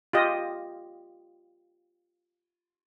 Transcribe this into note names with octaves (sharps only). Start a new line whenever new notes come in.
F4 G4 D#5